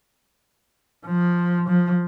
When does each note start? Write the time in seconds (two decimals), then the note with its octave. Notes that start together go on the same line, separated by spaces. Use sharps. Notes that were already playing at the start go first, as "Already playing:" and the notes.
1.06 F3
1.69 F3